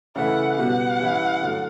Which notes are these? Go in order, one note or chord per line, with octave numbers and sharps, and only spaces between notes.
C#3 E3 A3 E4 F#5
B2 G3 B3 F#4 F#5
E3 G3 C#4 E4
D3 F#3 A3